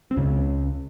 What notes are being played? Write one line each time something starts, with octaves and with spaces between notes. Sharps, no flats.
C4
C#2 C#3 C#4